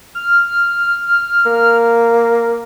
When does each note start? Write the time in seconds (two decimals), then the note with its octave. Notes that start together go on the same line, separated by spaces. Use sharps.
0.15 F6
1.46 A#3